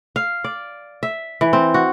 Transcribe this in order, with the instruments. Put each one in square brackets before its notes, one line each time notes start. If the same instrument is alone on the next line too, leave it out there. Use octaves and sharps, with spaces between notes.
[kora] F5
D5
E5
E3
C4
F#4